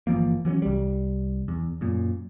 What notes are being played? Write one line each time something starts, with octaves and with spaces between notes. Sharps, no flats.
G1 E3 F3 A#3
E3 F#3 B3 C#4
C2 G3
E2
F#2 A#2